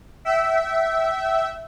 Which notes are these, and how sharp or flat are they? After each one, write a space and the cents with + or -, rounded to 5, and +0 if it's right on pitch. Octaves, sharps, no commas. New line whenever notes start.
E5 -5 G5 -40